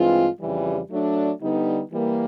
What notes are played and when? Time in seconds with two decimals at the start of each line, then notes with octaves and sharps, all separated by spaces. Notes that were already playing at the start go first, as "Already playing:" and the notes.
Already playing: G2 E3 G#3 C4 F4
0.39 F2 C#3 E3 G3
0.90 F#3 A3 D4
1.41 D3 G3 B3 D#4
1.92 E3 G3 A#3